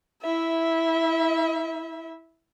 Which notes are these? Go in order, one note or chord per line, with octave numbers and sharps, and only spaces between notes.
E4 E5